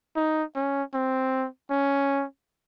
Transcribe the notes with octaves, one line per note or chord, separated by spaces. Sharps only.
D#4
C#4
C4
C#4